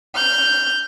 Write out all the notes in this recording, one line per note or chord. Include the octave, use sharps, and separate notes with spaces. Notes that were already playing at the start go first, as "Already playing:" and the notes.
F6 G6